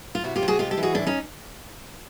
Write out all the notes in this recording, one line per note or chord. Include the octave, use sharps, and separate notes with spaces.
F4
C3 E4 F#4
F4 G4
C3
F#4 G#4
G#3 F4 G4
G4 A4
E3
F#4 G#4
A2 D4 E4
C#4 D#4